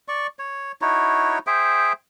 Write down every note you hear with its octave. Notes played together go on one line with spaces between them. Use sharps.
D5 C#6
C#5
D#4 E4 F#4 C#5
G#4 C5 E5 G5